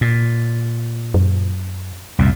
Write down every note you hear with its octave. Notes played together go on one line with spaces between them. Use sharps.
A#2
F#2
C2 F2 A#2